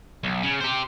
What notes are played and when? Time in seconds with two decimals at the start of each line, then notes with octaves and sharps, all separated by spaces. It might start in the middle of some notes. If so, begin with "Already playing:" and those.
0.23 B1
0.43 C#3
0.60 G4 C5